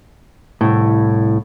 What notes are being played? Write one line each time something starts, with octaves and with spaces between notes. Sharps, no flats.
C2 A2